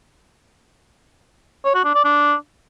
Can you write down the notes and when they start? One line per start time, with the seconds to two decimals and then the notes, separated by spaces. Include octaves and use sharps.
1.65 C#5
1.75 F#4
1.85 D4
1.94 D5
2.04 D4